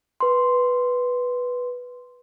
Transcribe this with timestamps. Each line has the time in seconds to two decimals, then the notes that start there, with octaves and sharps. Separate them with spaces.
0.20 B4 C6